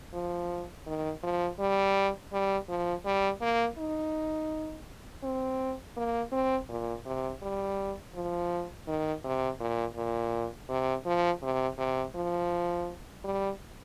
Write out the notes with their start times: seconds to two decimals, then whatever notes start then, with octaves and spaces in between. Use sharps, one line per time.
0.14 F3
0.87 D#3
1.23 F3
1.59 G3
2.32 G3
2.69 F3
3.05 G3
3.41 A#3
3.78 D#4
5.23 C4
5.97 A#3
6.32 C4
6.69 A#2
7.06 C3
7.42 G3
8.15 F3
8.88 D#3
9.24 C3
9.60 A#2
9.96 A#2
10.69 C3
11.06 F3
11.43 C3
11.78 C3
12.15 F3
13.24 G3